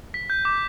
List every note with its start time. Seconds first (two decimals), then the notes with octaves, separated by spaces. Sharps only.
0.14 B6
0.30 G6
0.45 D6